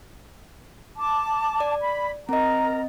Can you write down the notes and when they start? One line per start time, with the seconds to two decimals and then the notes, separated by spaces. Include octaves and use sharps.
0.97 A5 D6
1.60 D5
1.81 B5
2.29 C4 A#4 D#5 A#5